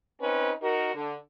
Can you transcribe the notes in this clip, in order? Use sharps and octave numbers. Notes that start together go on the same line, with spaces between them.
C4 C#4 D#4 B4
D#4 F#4 A#4
D3